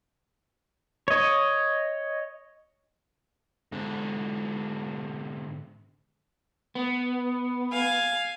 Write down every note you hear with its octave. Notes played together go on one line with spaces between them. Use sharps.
C#5 D#5
G#2 D3
B3
F5 G#5